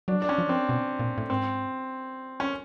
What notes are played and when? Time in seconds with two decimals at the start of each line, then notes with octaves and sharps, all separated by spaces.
0.08 F#3 D4
0.22 D4
0.29 C#4
0.38 F3
0.49 C4
0.69 B2
0.99 A#2
1.18 A2
1.30 G#2 C4
2.40 C#4